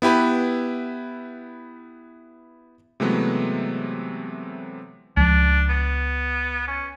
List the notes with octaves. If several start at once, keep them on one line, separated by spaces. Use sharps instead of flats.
B3 E4 G4 B4
C3 E3 F#3 G#3 A3 B3
C#2 F3 D4
B3
C#4